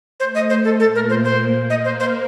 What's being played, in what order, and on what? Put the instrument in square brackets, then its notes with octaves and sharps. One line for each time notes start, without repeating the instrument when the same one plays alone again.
[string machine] A3 [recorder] C5
[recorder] D#5
C5
A4
[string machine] A#2 A#3 [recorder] A4
[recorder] A#4
C5
C5
[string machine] A#3 A#4 [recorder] D#5
[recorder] C5
C5